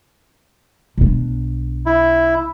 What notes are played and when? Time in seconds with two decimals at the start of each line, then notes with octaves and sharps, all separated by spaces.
0.98 B1 D4
1.86 E4